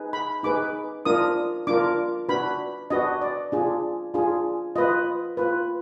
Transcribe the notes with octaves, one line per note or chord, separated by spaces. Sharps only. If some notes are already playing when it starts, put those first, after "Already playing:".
Already playing: D#4 G#4 B4
B5
D#4 G#4 B4 D6
D4 F4 A#4 D#6
D4 F4 A#4 D6
D4 F#4 B4 B5
D4 F#4 B4 D#5
D5
D4 F4 G#4
D4 F4 G#4
F4 B4 D#5
F4 B4